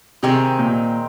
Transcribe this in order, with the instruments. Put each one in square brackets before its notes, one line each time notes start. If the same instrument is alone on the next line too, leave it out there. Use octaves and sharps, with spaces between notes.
[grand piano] C3 [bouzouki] D#3 G#3 C4 D#4
[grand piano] A#2